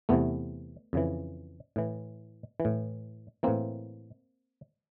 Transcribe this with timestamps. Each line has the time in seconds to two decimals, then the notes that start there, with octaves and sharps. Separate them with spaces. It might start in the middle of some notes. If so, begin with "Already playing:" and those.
0.09 E2 C3 E3 A3 B3
0.93 F2 C#3 E3
1.76 A2 E3
2.60 E3
2.65 A2
3.43 A2 E3 A#3 C4